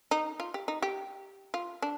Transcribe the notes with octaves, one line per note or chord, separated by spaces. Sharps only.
D#4
F4
G4
D#4
G4
F4
D4